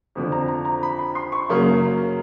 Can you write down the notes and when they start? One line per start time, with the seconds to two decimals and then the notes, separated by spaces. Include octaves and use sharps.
0.15 F2 D3 F3
0.32 A#5
0.48 A#5
0.65 A#5
0.83 B5
0.99 B5
1.15 C6
1.32 C#6
1.49 F#2 C#3 F#3 A#3